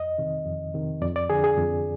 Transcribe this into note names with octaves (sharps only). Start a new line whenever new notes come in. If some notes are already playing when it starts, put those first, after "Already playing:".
Already playing: F2 D#5
C3 D#3
F2
C3 D#3
F2 D5
D5
D3 F3 G#4
G#4
F2